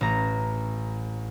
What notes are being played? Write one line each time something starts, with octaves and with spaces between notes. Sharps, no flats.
A1 A#5